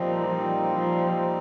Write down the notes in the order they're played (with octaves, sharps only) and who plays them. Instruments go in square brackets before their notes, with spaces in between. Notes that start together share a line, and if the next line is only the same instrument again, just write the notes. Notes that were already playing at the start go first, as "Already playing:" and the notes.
Already playing: [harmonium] A#2 G3 C4 D#4 [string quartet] F3
[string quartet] F3